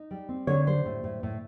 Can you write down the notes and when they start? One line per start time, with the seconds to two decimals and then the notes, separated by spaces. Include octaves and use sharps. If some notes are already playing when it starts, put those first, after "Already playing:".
Already playing: D#4
0.11 G3
0.29 C4
0.47 D3 C#5
0.67 G3 C5
0.85 A2
1.04 A2
1.23 A2